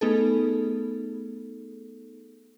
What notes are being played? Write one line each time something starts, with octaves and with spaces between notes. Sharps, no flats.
A3 B3 D#4 G#4 A4